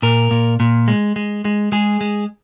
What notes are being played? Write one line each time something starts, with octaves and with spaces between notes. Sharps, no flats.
A#2 A#4
A#2
A#2
G#3
G#3
G#3
G#3 G#4
G#3